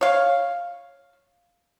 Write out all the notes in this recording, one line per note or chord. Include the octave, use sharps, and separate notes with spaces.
C#5 F5